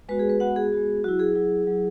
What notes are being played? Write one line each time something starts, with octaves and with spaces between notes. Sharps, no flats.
G#3 B3 F#4 B4
G#4
B4
G#3 B3 F#4 F#5
G#4
G#3 B3 F#4
F#3 E4 F#4
G#4
F#3 E4
F#3 E4